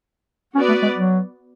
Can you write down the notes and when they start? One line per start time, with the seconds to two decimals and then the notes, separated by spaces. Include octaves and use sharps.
0.55 B3 C#4 F#4 B4 D5
0.68 A3
0.82 G#3
0.96 F#3